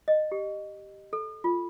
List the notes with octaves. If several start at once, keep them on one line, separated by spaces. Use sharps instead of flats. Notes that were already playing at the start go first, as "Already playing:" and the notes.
D#5
G4
A4
F4